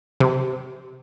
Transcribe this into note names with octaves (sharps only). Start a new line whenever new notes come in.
C3